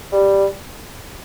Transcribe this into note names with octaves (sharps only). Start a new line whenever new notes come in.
G3